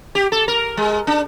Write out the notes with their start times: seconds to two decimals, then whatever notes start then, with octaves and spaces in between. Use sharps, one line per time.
0.15 G4
0.32 A4
0.48 A#4
0.77 G#3
1.07 D4